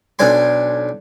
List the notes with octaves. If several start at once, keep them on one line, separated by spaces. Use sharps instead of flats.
B1 D4 G#5 C6